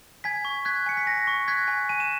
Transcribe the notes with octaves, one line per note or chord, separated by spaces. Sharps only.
G#5 G#6 B6
C#6
F#6 G#6 B6
G#5 C#7
B6
G#5 A#6
C#6
F#6 G#6 B6
G#5
G#5 D#7
E7